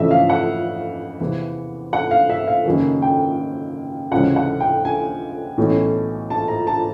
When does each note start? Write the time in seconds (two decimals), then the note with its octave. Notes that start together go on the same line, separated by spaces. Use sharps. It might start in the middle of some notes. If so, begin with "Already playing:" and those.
Already playing: F2 C#3 E3 A3 C#4 D#5 E5
0.11 F5
0.29 F#5
1.20 E2 C3 E3
1.93 F#5
2.11 F5
2.30 E5
2.48 F5
2.65 F#1 F#2 D#3
3.02 G5
4.11 C#2 C3 E3 G#3 C#4 F#5
4.36 F#5
4.60 G5
4.85 G#5
5.58 B1 A2 E3 A3 C#4
6.30 A5
6.48 A#5
6.67 A5